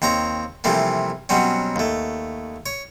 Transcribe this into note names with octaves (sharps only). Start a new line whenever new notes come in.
D#2 C4 C#5 A#5
C3 E3 F3 G3 A3 A#3
B2 F#3 G3 C4 C#4
D#2 A3
C#5